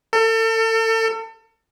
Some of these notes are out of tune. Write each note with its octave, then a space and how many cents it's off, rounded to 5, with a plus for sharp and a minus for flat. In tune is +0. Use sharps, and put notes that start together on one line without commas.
A4 +35